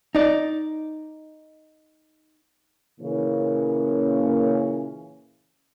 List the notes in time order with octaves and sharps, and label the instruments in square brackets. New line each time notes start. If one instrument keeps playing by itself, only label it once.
[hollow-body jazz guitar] D#4 D5
[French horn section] A#2 C#3 E3 A#3 C#4